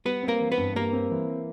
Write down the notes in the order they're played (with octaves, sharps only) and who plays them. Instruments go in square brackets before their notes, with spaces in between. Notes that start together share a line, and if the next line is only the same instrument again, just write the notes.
[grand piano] G3 [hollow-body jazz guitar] B3 B4
[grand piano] C4
[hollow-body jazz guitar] A#3 A#4
[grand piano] E3
[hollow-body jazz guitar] B3 B4
[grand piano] G2
[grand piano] G3 [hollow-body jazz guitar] A#3 A#4
[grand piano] C4
E3